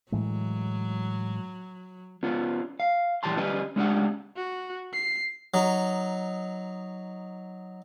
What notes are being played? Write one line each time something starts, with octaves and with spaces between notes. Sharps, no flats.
A2 E3 F#3 G#3
B3 C#4 F4
F5
A#2 E3 G3 G5 A5 C6
G3 C#4 B4 D#5
G#3 C#4 D4 G4 F#5
F#4
C7
F#3 D#4